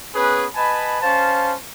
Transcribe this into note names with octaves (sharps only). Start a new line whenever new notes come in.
B3 C#4 G#4 B4
B4 D#5 G#5 A5 B5
C#4 C5 F5 A5